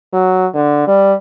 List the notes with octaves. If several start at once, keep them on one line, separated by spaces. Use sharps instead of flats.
F#3
D3
G3